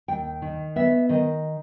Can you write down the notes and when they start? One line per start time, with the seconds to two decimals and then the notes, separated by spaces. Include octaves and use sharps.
0.08 D#2 G5
0.42 D#3
0.76 B3 E5
1.09 D#3 D#5